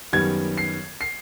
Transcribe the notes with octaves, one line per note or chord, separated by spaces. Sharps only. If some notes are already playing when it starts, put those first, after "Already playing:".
F#2 D#3 G3 B3 G#6
C7
C7